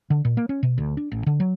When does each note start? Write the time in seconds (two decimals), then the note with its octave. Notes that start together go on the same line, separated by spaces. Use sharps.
0.10 D3
0.25 A#2
0.37 A#3
0.49 C#4
0.63 B2
0.78 D2
0.97 D4
1.12 A1
1.26 D3
1.40 F#3